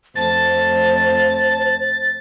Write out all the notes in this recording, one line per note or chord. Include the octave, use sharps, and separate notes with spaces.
F2 A3 C5 A5 A6